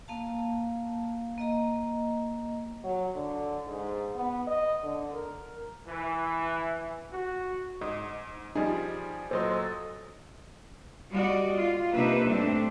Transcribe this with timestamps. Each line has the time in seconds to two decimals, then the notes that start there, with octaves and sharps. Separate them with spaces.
0.08 A#3 F5 A5
1.38 A#3 D#5 A#5
2.84 F#3
3.15 D3
3.67 G#2
4.16 B3
4.47 D#5
4.83 D3
5.14 A#4
5.87 E3
7.12 F#4
7.81 G#2 D#5
8.56 F3 G3 D#4 G#4
9.31 A#2 F#3 A4 C5 D#5 C6
11.13 G3 F#4 D5 D#5
11.57 F4
11.93 C3 A#3 D4 D#4 B4 E5
12.25 A2 G3 A3 C4 D4